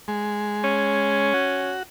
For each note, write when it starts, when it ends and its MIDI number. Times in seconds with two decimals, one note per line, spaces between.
0.08 1.33 56
0.64 1.74 61
1.34 1.83 66